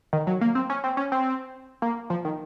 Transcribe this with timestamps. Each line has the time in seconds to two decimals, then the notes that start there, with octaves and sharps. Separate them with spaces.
0.13 D#3
0.27 F#3
0.41 A#3
0.55 C4
0.70 C#4
0.84 C4
0.97 C#4
1.12 C4
1.82 A#3
2.10 F3
2.25 D#3